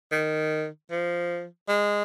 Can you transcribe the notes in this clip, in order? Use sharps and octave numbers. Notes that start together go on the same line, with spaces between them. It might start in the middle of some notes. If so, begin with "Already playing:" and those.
D#3
F3
G#3